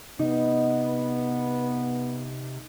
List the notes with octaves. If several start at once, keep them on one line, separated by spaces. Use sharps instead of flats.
C3 B3 D#4